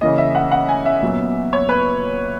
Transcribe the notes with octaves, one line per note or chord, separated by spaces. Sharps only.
C#3 E3 A#3 D#5
E5
F#5
F#5
G#5
E5
A#2 F#3 B3
C#5
B4